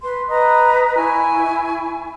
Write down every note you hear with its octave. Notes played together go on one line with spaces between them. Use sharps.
B4 C6
B4 D#5 A#5 D#6
E4 G#5 C#6